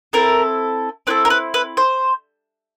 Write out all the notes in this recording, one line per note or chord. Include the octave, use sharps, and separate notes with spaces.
C4 E4 A4 A#4
C4 E4 A4 B4
A#4
B4
B4
C5